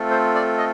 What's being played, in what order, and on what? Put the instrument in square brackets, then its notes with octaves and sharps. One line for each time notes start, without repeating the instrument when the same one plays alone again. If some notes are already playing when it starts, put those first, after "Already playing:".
Already playing: [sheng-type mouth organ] A3 C4 F4 A4
C5
D5
D#5